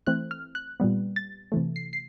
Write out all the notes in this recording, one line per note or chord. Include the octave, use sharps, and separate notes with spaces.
E3 A3 C4 F#6
F6
F#6
A#2 G3 B3
A6
C3 E3 A3
C7
C7